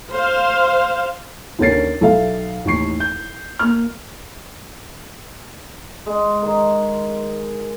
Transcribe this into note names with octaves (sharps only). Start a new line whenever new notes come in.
C5 F5
D#2 D3 C#4 A#4 A6 C7
B1 A4 E5 F5
A1 D#2 D#3 C#6 C7
G6
A#3 F6
G#3 C6
D#3 G#4